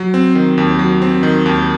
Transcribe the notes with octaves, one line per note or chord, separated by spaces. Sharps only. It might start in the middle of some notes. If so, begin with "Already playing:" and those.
Already playing: F#3
C4
D#3
D#2
F#3
C4
D#3
D#2